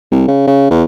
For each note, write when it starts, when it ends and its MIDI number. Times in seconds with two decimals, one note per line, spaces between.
0.11 0.24 36
0.28 0.42 49
0.47 0.68 49
0.70 0.84 40